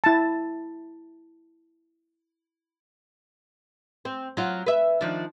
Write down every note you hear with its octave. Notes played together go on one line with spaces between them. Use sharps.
E4 A5
C4
F#3 F4
B4 E5
D#3 F3 D4